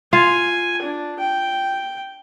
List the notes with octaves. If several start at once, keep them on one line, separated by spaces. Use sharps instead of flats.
F4 F5 G#5
D4
G5